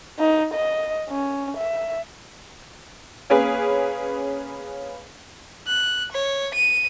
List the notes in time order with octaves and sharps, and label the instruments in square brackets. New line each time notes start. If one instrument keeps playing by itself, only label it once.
[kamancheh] D#4
D#5
C#4
E5
[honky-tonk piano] A#3 C#4 G#4 B4
[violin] F#6
C#5
D#7